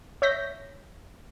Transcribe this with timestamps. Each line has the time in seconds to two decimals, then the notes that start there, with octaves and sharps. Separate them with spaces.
0.22 C#5 E5 G6 A#6 B6